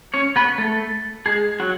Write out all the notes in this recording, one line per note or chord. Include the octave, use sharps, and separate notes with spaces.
C#4 C#5
B3 B4
A3 A4
G#3 G#4
F#3 F#4